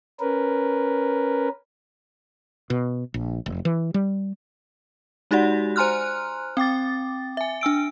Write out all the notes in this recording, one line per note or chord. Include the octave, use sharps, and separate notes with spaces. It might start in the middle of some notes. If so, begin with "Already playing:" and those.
C#4 A#4 B4
B2
A#1
F1
E3
G3
G#3 D#4 F#4 G4 D5 F#5
C5 G#5 A#5 C6 F6 F#6
C4 G5 D6 A6
E5 G#5
D4 G#5 E6 D7